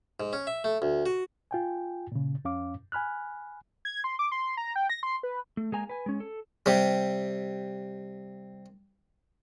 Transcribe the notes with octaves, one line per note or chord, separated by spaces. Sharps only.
G#2
C#4
E5
A3
D2
F#4
F4 G5 G#5
A#2 C#3
F2 C#4 F5 D6
G#5 B5 F6 F#6
G#6
C6
D6
C6
A#5
G5
A#6
C6
B4
A3
G#3 A#3 G#5 A#5
B4 G#5
G#3 C#4
A4
C3 G3